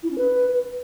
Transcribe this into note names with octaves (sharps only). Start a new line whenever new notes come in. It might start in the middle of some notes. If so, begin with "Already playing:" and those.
E4
C#4
B4